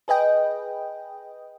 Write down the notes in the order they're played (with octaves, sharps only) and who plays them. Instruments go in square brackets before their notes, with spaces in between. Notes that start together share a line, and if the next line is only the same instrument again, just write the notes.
[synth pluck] G#4 B4 D#5 G5